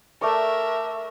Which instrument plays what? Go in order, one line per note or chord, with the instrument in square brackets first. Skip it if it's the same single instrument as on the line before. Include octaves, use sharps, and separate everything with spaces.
[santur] A3 D5 C#6 [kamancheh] A#4 E5